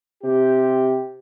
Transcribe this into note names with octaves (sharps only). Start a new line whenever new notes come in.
C3 G4